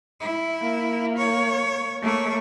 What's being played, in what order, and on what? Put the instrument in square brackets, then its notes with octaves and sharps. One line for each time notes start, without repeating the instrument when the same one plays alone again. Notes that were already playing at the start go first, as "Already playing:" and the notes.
[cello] E4
[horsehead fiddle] A#3
[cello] C#5
[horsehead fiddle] A3 [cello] A#3 C#5